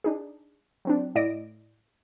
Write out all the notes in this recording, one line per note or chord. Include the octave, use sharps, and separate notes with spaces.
D4 D#4 G#4
F#3 C4 D4
A2 E4 D5 D#5 A#6 D7